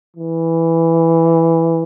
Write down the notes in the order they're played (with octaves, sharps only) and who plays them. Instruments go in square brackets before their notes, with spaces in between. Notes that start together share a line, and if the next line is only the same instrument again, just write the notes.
[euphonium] E3